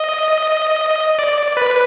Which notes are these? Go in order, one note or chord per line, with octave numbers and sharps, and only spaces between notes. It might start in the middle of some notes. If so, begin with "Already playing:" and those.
Already playing: D#5
D5
B4